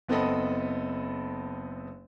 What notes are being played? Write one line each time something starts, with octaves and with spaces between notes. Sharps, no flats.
F#1 B3 C4 A4 D#5 B5